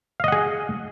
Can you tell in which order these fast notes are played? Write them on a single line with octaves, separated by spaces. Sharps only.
F5 D#5 F#5 G#4